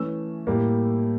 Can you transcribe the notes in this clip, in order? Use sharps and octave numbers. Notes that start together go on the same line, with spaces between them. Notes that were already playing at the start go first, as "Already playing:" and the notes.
Already playing: E3 A3 C#4 E6
A2 G3 A#3